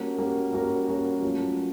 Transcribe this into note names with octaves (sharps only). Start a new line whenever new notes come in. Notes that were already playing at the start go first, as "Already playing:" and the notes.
Already playing: G3 A#3 C#4 F#4 A#4
G3 A#3 C#4 F#4 A#4
G3 A#3 C#4 F#4 A#4
G3 A#3 C#4 F#4 A#4
F#3 A3 C#4 F4